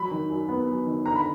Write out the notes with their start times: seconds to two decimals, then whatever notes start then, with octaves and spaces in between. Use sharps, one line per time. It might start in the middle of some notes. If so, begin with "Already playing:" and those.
Already playing: F#3 B5
0.11 D#3
0.30 F#2
0.48 B3
0.68 F#3
0.86 D#3
1.06 D3 A#5
1.16 B5